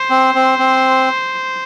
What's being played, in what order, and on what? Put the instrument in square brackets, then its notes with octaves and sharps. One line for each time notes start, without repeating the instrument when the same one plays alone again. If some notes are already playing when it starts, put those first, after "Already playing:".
Already playing: [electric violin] C5
[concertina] C4
C4
C4